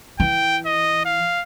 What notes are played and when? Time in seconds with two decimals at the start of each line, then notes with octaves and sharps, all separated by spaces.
0.20 E3 G5
0.66 D#5
1.05 F5